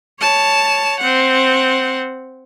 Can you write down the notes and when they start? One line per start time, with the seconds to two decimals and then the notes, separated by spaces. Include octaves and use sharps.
0.21 C#5 A5
1.00 C4 F#5